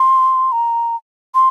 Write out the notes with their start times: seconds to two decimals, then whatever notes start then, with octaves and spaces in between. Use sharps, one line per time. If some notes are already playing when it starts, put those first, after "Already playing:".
Already playing: C6
0.52 A#5
1.35 C6